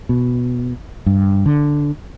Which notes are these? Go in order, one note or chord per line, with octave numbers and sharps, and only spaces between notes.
B2
G2
D3